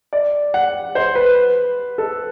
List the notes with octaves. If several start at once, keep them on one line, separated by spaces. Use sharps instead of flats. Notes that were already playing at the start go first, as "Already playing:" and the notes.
D5
F#5
C5
B4
A4